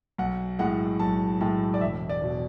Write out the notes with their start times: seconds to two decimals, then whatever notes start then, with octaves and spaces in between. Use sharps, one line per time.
0.18 B1 F#5
0.59 A2 G#3 F#5
0.99 B1 A5
1.41 A2 G#3 A5
1.74 D5
1.81 E1 E5
2.09 D5
2.22 E2 B2